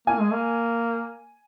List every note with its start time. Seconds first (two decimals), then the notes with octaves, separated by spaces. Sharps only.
0.07 A#3 G#5
0.20 G#3
0.32 A#3